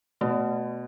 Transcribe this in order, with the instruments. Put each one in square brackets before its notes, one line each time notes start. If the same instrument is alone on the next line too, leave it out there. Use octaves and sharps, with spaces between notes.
[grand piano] B2 [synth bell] A3